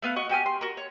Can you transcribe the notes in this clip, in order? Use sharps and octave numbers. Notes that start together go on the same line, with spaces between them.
A3 B3 F5 F#6
F#4 D#5 C#6
F#4 G4 G#5 F6
C6
F#4 A#4
C#5